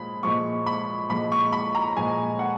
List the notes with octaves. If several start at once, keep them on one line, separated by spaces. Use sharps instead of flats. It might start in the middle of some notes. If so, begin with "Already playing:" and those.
Already playing: A#2 F3 G#3 B5
A#2 F3 G#3 C#6
B5
A#2 F3 G#3 B5
C#6
B5
A#5
A#2 F3 G#3 G#5
F#5